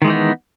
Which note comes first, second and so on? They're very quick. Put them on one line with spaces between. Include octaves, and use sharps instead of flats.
D#3 G#3 E3 D#4 B3